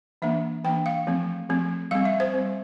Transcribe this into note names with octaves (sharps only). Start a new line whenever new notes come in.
E3 A#3 D4 E5
E3 A#3 D4 G5
F5
F3 A3 C4
F3 A3 C4
G3 C4 F5
E5
C5
G3 C4